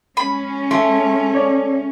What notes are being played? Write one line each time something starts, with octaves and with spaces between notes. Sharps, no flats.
G#3 C#4 B5
A3 C6
C#5 D5